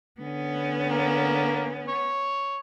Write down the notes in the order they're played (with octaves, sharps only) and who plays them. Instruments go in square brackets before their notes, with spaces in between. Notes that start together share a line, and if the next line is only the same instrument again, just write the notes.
[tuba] D3 [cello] B3 C#4
[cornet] A#3
C#5